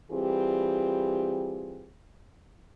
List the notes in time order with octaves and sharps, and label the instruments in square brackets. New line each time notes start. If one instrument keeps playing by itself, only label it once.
[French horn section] E3 G3 C4 F4 G4 G#4